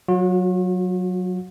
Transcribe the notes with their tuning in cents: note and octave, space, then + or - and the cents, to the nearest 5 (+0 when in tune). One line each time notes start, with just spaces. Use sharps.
F#3 -5 F#4 -45